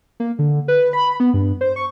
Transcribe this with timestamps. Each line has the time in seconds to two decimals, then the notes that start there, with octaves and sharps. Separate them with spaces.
0.20 A#3
0.39 D3
0.68 B4
0.93 B5
1.20 B3
1.34 G2
1.61 C5
1.76 C#6